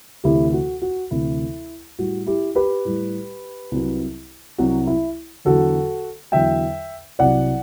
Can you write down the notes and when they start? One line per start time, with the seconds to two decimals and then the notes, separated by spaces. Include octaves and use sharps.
0.24 D2 C3 E3 E4 G4
0.53 F#4
0.82 F#4
1.11 D2 C3 E3 E4
1.99 A2 G3 F#4
2.27 E4 G4
2.55 G4 B4
2.85 A2 G3
3.71 C2 C3 F#3
4.58 C2 C3 F#3 F#4
4.87 E4
5.45 E2 D3 F#3 F#4 A4
6.32 E2 D3 F#3 E5 G5
7.19 C2 C3 F#3 D5 F#5